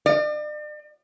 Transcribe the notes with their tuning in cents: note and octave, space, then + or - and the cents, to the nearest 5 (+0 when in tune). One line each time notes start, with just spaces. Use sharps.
D5 +40